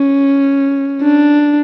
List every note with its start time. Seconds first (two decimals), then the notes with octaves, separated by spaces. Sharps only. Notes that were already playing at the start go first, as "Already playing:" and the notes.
Already playing: C#4
1.02 D4